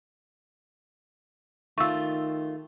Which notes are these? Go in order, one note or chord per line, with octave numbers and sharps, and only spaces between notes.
D#3 A3 F4 C#6 E6